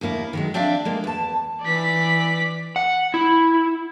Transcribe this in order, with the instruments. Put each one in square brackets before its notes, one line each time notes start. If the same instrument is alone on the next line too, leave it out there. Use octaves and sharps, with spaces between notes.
[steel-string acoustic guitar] D#2 B2 A#3 E4
D#3 F#3 G#3
C4 D4 D5 E5 F5 G5
G#3 A#3
E2 A5
[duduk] E3 [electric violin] D5 B6
[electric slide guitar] F#5
E4